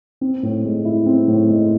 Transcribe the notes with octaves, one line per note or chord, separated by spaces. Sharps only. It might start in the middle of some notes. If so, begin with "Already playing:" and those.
C4
A2
G#3
E4
C4
A2
G#3